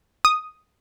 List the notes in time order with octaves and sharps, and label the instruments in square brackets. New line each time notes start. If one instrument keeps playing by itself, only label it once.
[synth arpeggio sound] D#6